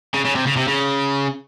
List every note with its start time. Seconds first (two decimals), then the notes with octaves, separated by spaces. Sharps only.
0.14 C#3
0.25 C#3
0.35 C3
0.46 C#3
0.57 C3
0.68 C#3